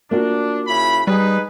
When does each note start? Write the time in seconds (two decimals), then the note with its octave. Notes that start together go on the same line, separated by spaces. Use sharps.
0.11 A#3 D4 F4 F#4
0.67 C#3 E4 B5
1.07 G3 D#4 G#4 B4